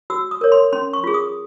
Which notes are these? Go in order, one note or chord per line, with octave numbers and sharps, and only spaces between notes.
F#4 E6
D#6
A#4 C#5
C6
C#4 C6
C#6
F4 G#4
D#6